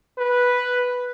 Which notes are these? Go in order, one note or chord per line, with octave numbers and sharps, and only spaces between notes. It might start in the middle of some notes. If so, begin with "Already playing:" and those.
B4